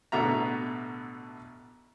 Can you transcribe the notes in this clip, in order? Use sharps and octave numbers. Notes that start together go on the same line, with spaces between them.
A1 B2 D3 B3 E5 A#5